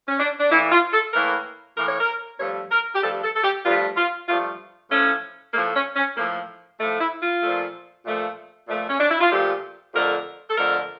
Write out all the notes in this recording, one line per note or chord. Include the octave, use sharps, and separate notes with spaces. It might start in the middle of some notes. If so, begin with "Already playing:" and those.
C#4
D4
D4
A2 E3 A#3 E4
F4
A4
A2 E3 A#3 A#4
A2 E3 A#3 A#4
C#5
A#4
G2 F3 A3 C#5
A#4
G4
G2 F3 A3 A4
A4
A4
G4
G2 F3 A3 F4
F4
G2 F3 A3 F4
A2 F3 A3 C#4
A2 F3 A3 A#3
C#4
C#4
A2 F3 A3 A#3
A2 F3 A3
E4
F4
A#2 F3 A3
A#2 F3 A3
A#2 F3 A3
C#4
D4
E4
F4
A#2 F3 A3 G4
F2 D3 A3 A#4
A4
F2 D3 A3 A#4